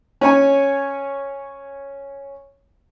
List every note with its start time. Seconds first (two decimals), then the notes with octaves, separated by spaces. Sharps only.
0.21 C#4 C#5 G#5